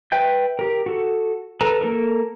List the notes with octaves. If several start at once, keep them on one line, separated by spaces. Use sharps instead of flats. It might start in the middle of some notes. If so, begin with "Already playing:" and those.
B4 E5 G5 G6
G4 A#4
F#4 A4
A4 B4 A#5
A#3 F4 A4 A#4